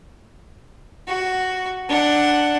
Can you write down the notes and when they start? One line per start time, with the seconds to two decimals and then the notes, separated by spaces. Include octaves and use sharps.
1.08 F#4
1.89 D4 F#5